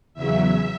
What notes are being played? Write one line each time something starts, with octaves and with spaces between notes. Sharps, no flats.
E2 C#3 F#3 E5